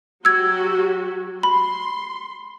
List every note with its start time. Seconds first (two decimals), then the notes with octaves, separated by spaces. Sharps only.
0.25 F#3 F#4 G4 E6 G#6
1.43 B5 C6